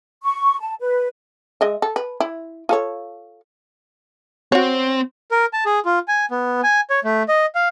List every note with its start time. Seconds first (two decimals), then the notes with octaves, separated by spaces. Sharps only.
0.24 C#6
0.60 A5
0.80 B4
1.61 G#3 D#5 E5
1.82 A4
1.96 B4
2.20 E4
2.69 F4 A4 C#5
4.52 C4 F#4 C#5
5.31 A#4
5.53 A5
5.66 G#4
5.85 F4
6.08 G#5
6.31 B3
6.63 G#5
6.90 C#5
7.04 A3
7.28 D#5
7.55 F5